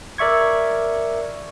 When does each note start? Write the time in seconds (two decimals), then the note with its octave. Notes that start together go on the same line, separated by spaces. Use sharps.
0.18 A#4 D5 E5 C#6 G#6